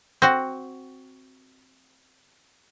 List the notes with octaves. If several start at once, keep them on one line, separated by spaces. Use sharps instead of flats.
C4 F#4